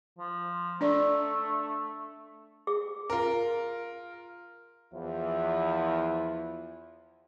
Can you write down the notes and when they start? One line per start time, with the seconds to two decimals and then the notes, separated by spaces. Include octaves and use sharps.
0.18 F3
0.81 A3 D4 D5
2.67 G#4
3.10 F4 A#4
4.93 E2 F3 E4